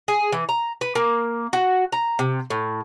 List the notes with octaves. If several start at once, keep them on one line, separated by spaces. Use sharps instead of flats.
G#4
E3
A#5
B4
A#3
F#4
A#5
C3
A2